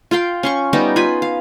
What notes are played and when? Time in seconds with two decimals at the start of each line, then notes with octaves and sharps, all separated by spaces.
0.11 F4 F5 G5 C6
0.43 C#4 C6 C#6
0.73 G3 B3 D#4 G4
0.96 F4 B4 G#5 B5
1.22 F5